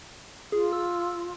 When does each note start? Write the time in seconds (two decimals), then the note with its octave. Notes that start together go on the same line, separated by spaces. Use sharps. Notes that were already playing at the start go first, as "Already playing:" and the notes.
0.52 F4 G#4
0.73 E6